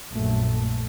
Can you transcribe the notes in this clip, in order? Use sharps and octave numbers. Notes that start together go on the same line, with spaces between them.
A#1 F#2 A3